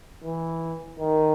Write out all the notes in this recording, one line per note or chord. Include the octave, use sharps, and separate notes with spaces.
E3
D#3